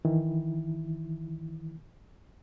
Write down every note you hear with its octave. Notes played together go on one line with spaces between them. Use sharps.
D#3 E3 E4